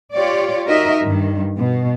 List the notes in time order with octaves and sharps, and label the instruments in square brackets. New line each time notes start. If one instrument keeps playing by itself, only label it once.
[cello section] F4 G4 C#5 D5
D#4 F#4 A#4 D#5 E5
G2 D#3
B2